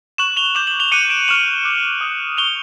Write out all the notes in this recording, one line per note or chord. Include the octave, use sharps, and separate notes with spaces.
C#6 F#6 E7 F#7
F7 G7
D6 G6 E7 F#7
E7 F#7
F7 G7
D6 F#6 C#7 D#7
D7 E7
C#6 F6 E7 F#7
D6 F#6
D#6 F#6
C#6 F6 F7 G7